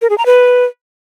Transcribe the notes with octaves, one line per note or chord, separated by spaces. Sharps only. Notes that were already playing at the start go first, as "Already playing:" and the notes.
A#4
G#4
A#5
B4